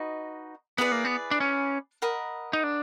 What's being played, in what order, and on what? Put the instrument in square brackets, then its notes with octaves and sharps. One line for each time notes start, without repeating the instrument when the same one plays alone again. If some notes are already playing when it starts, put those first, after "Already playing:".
Already playing: [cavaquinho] D#4 F#4 B4 D#5
[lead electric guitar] B3 [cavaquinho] E4 G#4 B4 D5
[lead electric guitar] A#3
B3
D4
C#4
[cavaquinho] A#4 D#5 F#5 B5
[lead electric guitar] D#4
D4